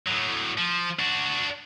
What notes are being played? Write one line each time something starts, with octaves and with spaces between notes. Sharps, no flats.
A2 F#3
F3
D4 F#4